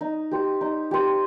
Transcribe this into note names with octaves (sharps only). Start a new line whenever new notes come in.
D#4
G4 C5
D#4
G4 C5